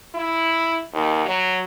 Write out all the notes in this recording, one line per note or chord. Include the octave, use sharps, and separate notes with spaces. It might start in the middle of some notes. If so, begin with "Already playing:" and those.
E4
D#2
F#3